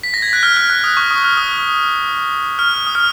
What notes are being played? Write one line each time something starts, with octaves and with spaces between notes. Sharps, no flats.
B6
A#6
G#6
F#6
F6
F6
F#6
D#6
C#6
D#6
F6
D#6
F6
D#6
F6